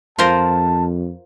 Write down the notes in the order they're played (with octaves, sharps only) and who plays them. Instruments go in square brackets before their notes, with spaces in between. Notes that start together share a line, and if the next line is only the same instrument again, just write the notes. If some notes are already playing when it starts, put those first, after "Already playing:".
[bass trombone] F2 [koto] F4 A#4 C5 [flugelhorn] A5